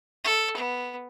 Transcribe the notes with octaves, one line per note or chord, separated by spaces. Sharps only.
A4
B3